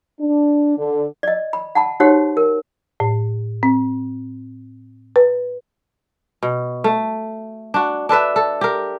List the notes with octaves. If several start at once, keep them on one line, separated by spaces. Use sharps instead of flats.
D4
D3
D5 D#5
B5
F#5 A5 B5
D#4 F#4 G4 C5 C#5 F#5
A#4
A2
C4
B4
B2
A3
D4 F#4
D4 A4 B4 E5
A4
G4 A#4